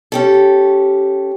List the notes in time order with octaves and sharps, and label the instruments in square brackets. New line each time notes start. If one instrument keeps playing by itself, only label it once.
[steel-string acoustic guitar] C#4 G4 A4